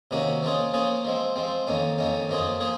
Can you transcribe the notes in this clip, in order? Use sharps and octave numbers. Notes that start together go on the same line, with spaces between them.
C3 D#3 A#3 C#4 F#4
F3 A#3 C#4 F4 G#4
F3 A#3 C#4 F4 G#4
F3 G#3 C4
F3 G#3 C4
F2 D#3 A#3 C#4
F2 D#3 A#3 C#4
F#2 F3 A#3 F4 G#4
F3 A#3 F4 G#4